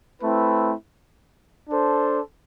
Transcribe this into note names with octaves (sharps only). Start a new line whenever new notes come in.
A3 C4 E4 B4
D4 A4 C5